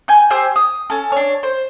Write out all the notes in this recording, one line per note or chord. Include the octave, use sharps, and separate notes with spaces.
G#5 G6
G4 C5 G#5 E6
D#6
C#4 A4
D4 C#5
C5